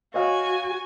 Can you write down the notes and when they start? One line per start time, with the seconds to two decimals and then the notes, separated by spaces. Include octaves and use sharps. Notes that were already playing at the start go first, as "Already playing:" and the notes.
0.14 F#4 C#5 D#5 F5 G#5